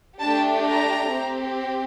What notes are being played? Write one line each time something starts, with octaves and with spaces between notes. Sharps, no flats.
A3 D4 G4 A5
A#5
C4 G4